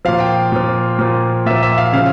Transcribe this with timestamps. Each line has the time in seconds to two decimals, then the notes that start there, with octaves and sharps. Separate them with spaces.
0.05 A#2 F3 F5
0.20 G5
0.52 A#2 F3
0.99 A#2 F3
1.46 A#2 F3 E5
1.63 E5
1.78 F5
1.93 C#3 F3 F5